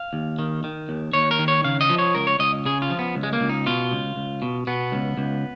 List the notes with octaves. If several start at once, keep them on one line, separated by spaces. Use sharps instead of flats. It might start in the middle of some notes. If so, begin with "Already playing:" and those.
Already playing: F5
D#2
D#3
D#3
D#2
D#2 C#5
A#4
D#3
C#5
C#3 F5
D#5
F3
C#5
C#2 A#4
C#5
C#2 D#5
C#3 G#4
F4
F3
B3
C#2
G#3
A#3
C#2
D#4
B2 F4
C#2
C#2
B2
B2 B3
C#2
C#2